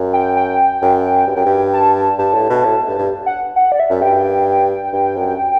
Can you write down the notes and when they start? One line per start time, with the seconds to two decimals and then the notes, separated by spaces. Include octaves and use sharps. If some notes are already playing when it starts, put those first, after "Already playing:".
Already playing: F#2
0.14 G5
0.37 G5
0.82 F#2
1.28 G2
1.36 F#2
1.46 G2
1.74 A5
1.96 A5
2.19 G2 A5
2.35 A2
2.49 B2
2.65 A2
2.88 G2
2.99 G2
3.26 F#5
3.56 F#5
3.72 D5
3.80 E5
3.90 F#2
4.01 G2 G5
4.93 G2
5.16 F#2